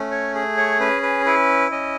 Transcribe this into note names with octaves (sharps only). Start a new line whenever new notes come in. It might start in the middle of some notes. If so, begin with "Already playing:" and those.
Already playing: A3 C#4
C#5
G#4
C#5
C#4 B4
B4
E4 B4
C#4 D#5